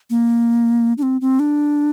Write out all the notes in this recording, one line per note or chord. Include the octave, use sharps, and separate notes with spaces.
A#3
D4
C4
C4
D4